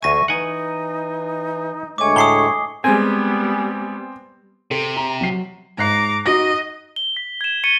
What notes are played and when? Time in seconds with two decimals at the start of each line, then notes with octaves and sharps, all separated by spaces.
0.03 D2 E5 G#5 C#6 A#6 D#7
0.28 E3 D#4 F#5 G#5
1.98 D2 G#3 A3 C#5 G#5 D6
2.16 A2 D#6 C7 G7
2.84 G3 G#3 B3 C4 C5 G#5
4.71 C3 A4
4.96 A#5
5.21 F#3 C7
5.78 G#2 A#5 D6 F#6 C7
6.26 D#4 F#4 D#5 A#6
6.96 G7
7.17 B6
7.41 G#6 E7
7.64 C#6 A6 C#7 D#7 G7